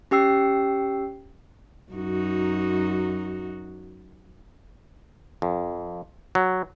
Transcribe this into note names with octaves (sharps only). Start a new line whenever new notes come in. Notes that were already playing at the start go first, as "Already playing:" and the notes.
C#4 G4 G5 E6 C7
F#2 D#4 F#4
F2
F#3